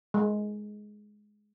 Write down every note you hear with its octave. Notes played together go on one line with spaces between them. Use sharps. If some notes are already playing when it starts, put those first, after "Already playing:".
G#3